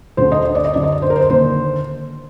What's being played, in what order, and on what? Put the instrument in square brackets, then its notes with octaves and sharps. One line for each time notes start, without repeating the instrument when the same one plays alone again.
[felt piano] D2 D3 C5
D#5
D#5
D5
D#5
F#2 D3 D5
D#5
D5
C5
A#4
C5
D#2 D3 C5